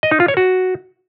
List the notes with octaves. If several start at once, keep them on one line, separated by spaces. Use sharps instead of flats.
D#5
D#4
F4
C#5
F#4